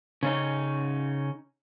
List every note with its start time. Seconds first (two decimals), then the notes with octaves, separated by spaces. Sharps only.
0.23 C#3 C#4 D#4